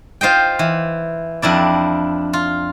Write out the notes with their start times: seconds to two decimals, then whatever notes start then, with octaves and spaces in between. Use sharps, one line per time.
0.21 F4 C5 D#5 G5
0.59 E3
1.42 F2 D4 E4 D5
2.33 F4